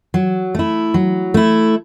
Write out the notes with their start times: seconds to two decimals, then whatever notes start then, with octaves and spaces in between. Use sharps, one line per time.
0.14 F#3
0.55 A3 E4
0.94 F#3
1.34 A3 E4